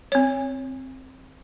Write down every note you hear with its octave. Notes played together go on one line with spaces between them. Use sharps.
C4 C#5